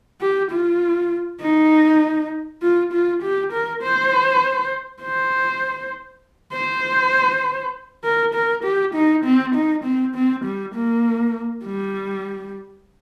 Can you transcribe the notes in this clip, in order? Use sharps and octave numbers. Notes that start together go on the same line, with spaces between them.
G4
F4
D#4
F4
F4
G4
A#4
C5
C5
C5
A#4
A#4
G4
D#4
C4
D#4
C4
C4
G3
A#3
G3